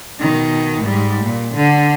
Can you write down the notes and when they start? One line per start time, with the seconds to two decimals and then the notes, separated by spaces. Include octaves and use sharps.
0.20 B2 D#3
0.81 G#2 G3
1.24 A#2
1.55 D3